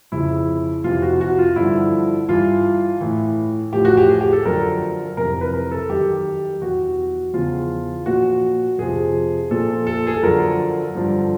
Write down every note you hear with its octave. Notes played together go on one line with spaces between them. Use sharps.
F2 C#3 F3 E4
F2 C3 E3 F4
F#4
F#4
F4
G2 D3 F3 E4
G2 E3 F4
A2 E3
A2 F3 G4
F#4
G4
G#4
G4
A4
F#2 D3 F3 A#4
F2 C3 E3 A#4
B4
A#4
A4
F#2 D#3 G4
E2 B2 F#4
E2 C#3 F3 F4
A#2 F3 F#4
F2 C3 F3 G#4
A#2 F3 A4
A4
G#4
A4
F#2 D3 F3 A#4
G2 D3 F3